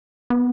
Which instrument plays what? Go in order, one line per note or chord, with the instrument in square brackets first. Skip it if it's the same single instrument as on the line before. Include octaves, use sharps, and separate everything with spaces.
[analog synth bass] B3